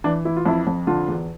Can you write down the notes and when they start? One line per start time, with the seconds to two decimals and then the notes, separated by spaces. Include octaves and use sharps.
0.04 E3 D4
0.25 E3 E4
0.37 F4
0.46 F2 E4
0.67 F2
0.87 D3 F4
1.08 E2